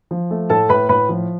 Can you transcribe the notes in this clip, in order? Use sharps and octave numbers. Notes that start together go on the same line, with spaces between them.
F3
A3
A2 A4 A5
A2 B4 B5
A2 B4 B5
F3